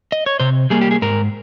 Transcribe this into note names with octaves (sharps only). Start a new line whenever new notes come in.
D#5
C#5
C3 C5
G3 A#3 G#4
G4
G#4
G#2 A#4